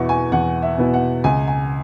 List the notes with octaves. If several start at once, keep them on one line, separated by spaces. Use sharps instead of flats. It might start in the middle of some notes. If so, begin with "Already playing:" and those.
Already playing: E2 B2 B3 E4 C#6
G#5
E2 F#5
E5
B2 B3 E4
F#5
C#2 G#5
G#5